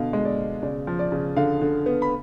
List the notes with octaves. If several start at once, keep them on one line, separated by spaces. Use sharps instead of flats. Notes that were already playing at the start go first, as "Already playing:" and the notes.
Already playing: B2 D3 F5
G#3
D5
B2
C#3 D5
F3
D5
C#3
D3 F5
D3
B3
B5